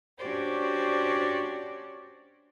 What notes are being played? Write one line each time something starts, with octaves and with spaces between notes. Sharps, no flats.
C#4 D4 F#4 G4 C5 D5